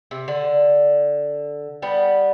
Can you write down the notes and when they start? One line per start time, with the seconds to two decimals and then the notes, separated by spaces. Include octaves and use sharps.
0.11 C3
0.28 D3
1.82 G3 B3